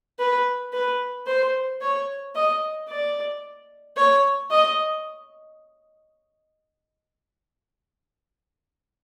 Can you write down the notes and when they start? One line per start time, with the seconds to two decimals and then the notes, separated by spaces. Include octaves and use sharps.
0.19 B4
0.73 B4
1.27 C5
1.81 C#5
2.35 D#5
2.89 D5
3.97 C#5
4.51 D#5